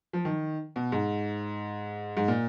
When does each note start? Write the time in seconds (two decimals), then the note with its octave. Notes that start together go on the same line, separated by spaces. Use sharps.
0.13 F3
0.25 D#3
0.76 B2
0.92 G#2
2.17 G#2
2.28 A#2